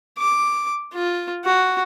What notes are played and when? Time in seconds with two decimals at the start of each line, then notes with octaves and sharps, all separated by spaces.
0.18 D6
0.94 F4
1.45 F#4